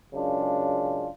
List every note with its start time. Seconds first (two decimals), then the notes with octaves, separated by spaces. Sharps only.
0.14 F#2 C#3 G#3 D4 F4